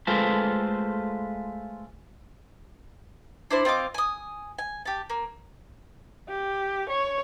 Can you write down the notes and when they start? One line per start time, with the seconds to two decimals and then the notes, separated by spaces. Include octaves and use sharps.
0.07 G#3 A3 F4 A4 B4 C5
3.51 D4 E4 C5
3.65 C4 F4 D#5 D6
3.94 G#5 D#6
4.58 G#5
4.85 G4 A5
5.10 A#3
6.29 G4
6.90 C#5